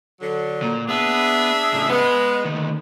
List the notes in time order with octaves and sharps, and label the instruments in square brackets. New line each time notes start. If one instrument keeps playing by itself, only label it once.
[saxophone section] D3 F#3
[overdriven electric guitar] A#2
[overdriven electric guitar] B3 [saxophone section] D4 G#4 E5
[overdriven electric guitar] A2 C#3
[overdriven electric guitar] G#3 G#4 [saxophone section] B3
[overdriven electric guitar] D2 D#3